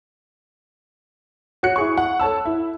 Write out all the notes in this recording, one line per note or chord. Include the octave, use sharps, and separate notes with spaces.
F#4 C#5 F#6 C#7
E4 G#4 C#6
F#5
A4 C#5 A5 E6
E4